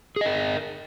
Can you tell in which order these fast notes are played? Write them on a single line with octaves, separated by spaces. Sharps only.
G#4 D#5 A#4